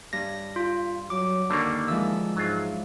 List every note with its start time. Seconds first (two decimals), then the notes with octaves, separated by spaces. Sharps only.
0.13 G2 A#6
0.56 F4
1.10 F#3 D6
1.50 D#2 D3 G3 A#3 D4 C#6
1.88 E3 F3 G#3 E6
2.36 G#2 F#3 F4